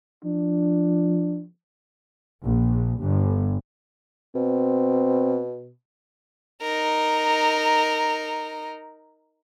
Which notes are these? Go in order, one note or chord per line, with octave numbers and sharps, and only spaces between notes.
F3 D4
A#1
G1
B2 C4
D#4 A#4